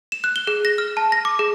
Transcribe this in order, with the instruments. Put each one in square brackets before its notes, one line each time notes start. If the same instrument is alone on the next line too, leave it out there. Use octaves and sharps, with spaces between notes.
[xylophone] E7
F#6
G7
G#4
A#6
F6
A5
A#6
D6
G#4